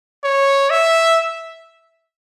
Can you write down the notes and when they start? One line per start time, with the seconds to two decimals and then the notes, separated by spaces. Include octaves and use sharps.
0.24 C#5
0.71 E5